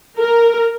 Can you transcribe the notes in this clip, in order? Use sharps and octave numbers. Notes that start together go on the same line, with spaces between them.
A#4